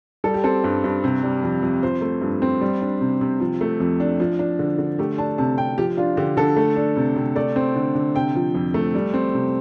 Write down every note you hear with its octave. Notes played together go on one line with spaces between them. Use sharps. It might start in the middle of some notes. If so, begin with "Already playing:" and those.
G3 A4
G4
C4 A4
G2
G2
C3
G3
F2
F2
F3 C5
A3
G2
C4
G3
D4
C3
C3
F3
A3
F2
D4
F3
D4
D3
D3
A3 G4
D4 A5
C3 A5
C3 G5
F3 G4
D4 F4
D3 G4
D3 A4
A3
D4
C3
C3
A3 D5
C4
D3
D3
C3 G5
F3
F2
A3
G3
C4
C3